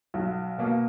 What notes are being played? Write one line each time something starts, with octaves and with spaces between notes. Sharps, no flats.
B1 F#4
B2 A#3